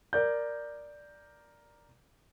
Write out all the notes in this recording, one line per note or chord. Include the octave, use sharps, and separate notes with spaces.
A#4 D5 G6